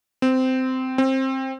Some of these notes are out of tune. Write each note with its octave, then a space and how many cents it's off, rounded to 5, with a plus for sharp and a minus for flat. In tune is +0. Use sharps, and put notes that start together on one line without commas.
C4 -15
C4 +20